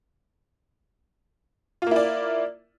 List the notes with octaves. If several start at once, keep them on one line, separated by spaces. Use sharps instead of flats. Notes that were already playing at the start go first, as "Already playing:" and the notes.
A#3 E4 F4 D5